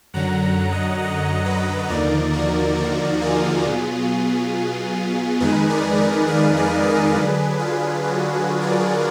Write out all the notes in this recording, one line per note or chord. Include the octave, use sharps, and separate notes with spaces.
F#2 D3 F#3 F#5 A#5
D#5 F#5
D#5 F#5
B4 D#5
D#2 D3 F3 A#3 D#4 A#4 D5
F#4 A#4
F#4
F4 G#4
B2 F#3 B3
F2 D#3 G#3 D#4 G#4 B4
A#4 D5
A#4 D5
D5 F5
B4 D#5
A#4 D5
D3 F#3 D4 G#4 B4
F4 G#4
F#4
F#4
A#4 D5